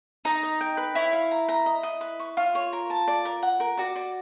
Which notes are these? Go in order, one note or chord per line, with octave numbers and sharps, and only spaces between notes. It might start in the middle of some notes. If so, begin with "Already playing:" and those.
D#4 A#5
D#5
G5
B4
E4 C#5
F5
A#5
A#5
D#5
D#5
B4
C#6
F4 C#5
C#5
A#4
A5
D5
A#4
F#5
A#4
F#4 D5
D5